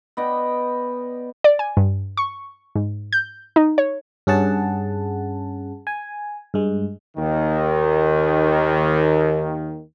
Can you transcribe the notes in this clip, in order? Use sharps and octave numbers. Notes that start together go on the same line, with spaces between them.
B3 D5 D#5 G5
D5
G#5
G2
C#6
G#2
G6
D#4
C#5
G2 C#4 G#4 F#5 A5
G#5
G2 G#3
D#2 D#3